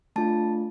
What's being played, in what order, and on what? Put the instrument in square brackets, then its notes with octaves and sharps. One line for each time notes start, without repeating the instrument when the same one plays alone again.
[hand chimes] A3 D4 F4 A5